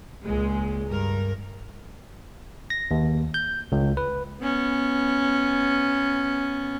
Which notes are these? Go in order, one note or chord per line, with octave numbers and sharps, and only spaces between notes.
C#2 A#2 G#3
G2 A#4
A#6
D#2
G6
C#2
B4
B3 C#4